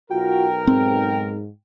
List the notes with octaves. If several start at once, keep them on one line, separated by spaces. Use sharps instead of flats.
B1 F4 F#4 A#4 G5
G#2 C4